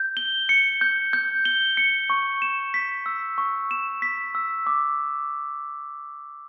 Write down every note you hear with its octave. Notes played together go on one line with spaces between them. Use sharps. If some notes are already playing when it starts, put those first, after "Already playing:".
Already playing: G6
G7
C#7
G6
G6
G7
C#7
C#6
E7
B6
E6
C#6
E7
B6
E6
D6